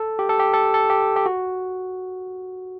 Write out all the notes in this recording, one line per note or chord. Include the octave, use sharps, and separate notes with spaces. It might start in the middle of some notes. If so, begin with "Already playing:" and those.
Already playing: A4
G4
A4
G4
A4
A4
G4
G4
F#4